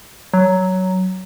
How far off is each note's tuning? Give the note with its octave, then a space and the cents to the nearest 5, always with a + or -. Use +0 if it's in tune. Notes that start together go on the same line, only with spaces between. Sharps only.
F#3 +10